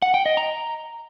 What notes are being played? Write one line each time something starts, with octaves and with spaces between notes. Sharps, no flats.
F#5
G5
D#5
A#5